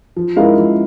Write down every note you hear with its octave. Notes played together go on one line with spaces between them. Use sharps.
F3
G#3 E4 A#4 F5
F3